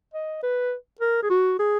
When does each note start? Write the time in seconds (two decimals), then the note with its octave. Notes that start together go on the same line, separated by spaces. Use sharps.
0.14 D#5
0.43 B4
1.01 A#4
1.23 G#4
1.30 F#4
1.59 G#4